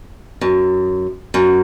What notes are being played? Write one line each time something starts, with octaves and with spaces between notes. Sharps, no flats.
F#2
F#2